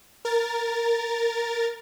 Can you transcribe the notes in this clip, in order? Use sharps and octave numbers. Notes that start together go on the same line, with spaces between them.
A#4 A6